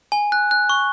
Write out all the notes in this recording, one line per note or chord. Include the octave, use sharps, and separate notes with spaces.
G#5
F#6
F#6
C#6